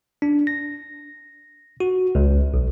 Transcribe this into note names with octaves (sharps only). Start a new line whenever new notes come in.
D4
A#6
F#4
C#2
B1